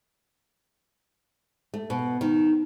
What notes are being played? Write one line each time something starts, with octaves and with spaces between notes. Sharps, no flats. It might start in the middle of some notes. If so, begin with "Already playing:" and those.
A3
B2
D#3